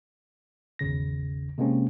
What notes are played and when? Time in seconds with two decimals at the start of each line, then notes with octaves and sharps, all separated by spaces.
0.79 G#1 E2 C#3 A#6
1.58 C3 G#3 A#3 C4 C#4